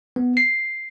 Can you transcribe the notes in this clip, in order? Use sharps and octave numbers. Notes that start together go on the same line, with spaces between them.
B3
C7